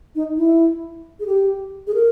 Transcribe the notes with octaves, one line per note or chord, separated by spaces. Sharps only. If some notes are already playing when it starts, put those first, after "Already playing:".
D#4
E4
G#4
G4
G#4
A#4